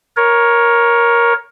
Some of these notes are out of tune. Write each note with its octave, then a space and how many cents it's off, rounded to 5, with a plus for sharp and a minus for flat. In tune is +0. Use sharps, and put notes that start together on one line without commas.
A#4 +15 C#5 +0